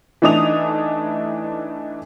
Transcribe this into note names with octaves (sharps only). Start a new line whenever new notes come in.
E3 A3 D4 D#4 D#6 F7